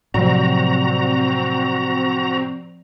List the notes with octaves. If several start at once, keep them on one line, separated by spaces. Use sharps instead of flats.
A2 C3 F3 F#3 C4 F#4 D5 A#5